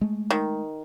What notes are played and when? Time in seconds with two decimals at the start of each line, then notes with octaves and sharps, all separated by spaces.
0.01 G#3 A3
0.30 D#3